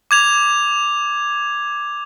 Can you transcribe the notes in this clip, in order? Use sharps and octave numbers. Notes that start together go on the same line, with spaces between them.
D6 G#6 F7